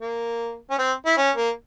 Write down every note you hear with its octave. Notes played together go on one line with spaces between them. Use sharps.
A#3
C#4
C4
E4
C#4
A#3